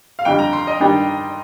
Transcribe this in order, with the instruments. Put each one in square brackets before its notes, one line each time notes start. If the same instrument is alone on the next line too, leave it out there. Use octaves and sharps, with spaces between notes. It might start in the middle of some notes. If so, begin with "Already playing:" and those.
[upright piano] F5
[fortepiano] F2 D3 G3 [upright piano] G5
[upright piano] A#5
C6
D#5
[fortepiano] G2 D#3 G3 D4